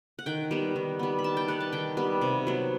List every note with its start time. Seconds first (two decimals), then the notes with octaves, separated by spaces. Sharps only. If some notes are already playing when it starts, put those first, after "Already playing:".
0.19 F#5
0.26 D#3 G5
0.51 G3 B3
0.76 D#3
0.99 G3 B3
1.18 B5
1.24 D#3 A5
1.37 G5
1.48 G3 B3 F#5
1.60 A5
1.72 D#3 G5
1.97 G3 B3
2.21 C3
2.47 F#3 B3